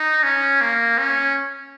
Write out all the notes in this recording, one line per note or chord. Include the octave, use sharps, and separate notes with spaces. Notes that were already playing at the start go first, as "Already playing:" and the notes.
Already playing: D#4
C#4
A#3
C#4